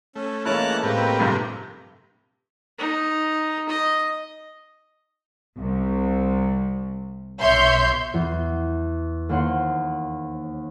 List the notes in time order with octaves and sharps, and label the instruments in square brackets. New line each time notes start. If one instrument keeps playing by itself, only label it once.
[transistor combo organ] A3 [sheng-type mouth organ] C#4
[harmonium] E3 G#3 A#3 [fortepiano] C#4 E4 [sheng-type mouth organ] A5 A#5 F#6
[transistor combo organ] A2 G4 A#4 [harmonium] G#3 A#3 C4 [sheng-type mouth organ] B4
[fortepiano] A#1 G2 C3
[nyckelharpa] D#4
D#5
[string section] C2
B1 C#5 E5 C6 G6
[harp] E2
D#2 A#3 C5 C#5 F#5 C6